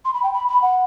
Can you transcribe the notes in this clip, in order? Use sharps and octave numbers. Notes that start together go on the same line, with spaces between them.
C6
B5
G5
B5
B5
F#5